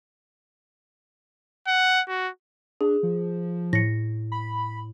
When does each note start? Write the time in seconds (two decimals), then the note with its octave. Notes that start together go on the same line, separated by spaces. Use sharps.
1.67 F#5
2.08 F#4
2.81 D4 G#4
3.03 F3
3.73 A2 A#6 C#7
4.32 B5